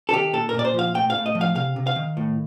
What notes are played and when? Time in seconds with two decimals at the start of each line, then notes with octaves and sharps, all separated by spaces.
0.09 A4
0.13 D#3 G4
0.33 A#2 A4
0.49 A#4
0.54 A#2 D5
0.65 C5
0.74 F3 F5
0.95 A2 G5
1.10 F5
1.15 A2
1.26 D#5
1.35 F3
1.41 F5
1.55 C3 F5
1.76 C3
1.87 F5
1.96 D#3
2.17 A2